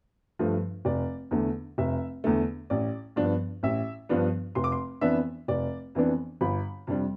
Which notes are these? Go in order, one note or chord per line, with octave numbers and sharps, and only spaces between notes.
G2 F3 A3
F1 D5
E2 D3 A3
F1 E5
E2 D3 A3
A1 D5
G2 F3 B3 D4
A1 E5
G2 F3 B3 D4
F1 C6
D6
C6
F2 E3 B3 D4 E5
F1 D5
F2 E3 B3 D4
G1 B5
F2 C3 G3 D4